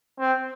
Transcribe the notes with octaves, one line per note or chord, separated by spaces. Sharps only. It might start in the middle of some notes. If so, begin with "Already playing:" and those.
C4